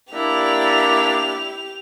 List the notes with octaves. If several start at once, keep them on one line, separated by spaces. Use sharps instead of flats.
A#3 D4 E4 G4 D5 E5 F7